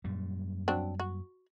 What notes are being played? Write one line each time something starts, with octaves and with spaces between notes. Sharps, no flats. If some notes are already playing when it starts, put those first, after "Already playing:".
F#2 A#2 G3
F#3 C4 D4
F#4